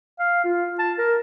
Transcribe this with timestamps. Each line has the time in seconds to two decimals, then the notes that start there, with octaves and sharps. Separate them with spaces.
0.19 F5
0.45 F4
0.79 A5
0.98 A#4